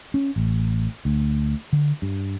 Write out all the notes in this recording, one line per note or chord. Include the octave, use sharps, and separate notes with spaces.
C#4
A1
D2
D3
G2